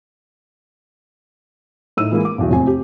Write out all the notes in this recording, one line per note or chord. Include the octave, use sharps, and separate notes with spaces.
A2 D#4 E6 D#7
E3 G#3 A#3 E4
D6
B1 E2 F#3
F1 C4 G#5
G4